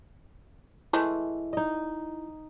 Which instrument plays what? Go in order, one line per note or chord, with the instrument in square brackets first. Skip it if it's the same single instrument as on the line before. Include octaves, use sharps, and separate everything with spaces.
[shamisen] E3 G#3 A3 [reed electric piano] E4
[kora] D#4 D#5